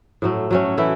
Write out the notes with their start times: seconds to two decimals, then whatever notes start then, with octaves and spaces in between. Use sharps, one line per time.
0.22 A2 F#3 A3
0.51 F#3 A3 C#4
0.78 E3 A3 E4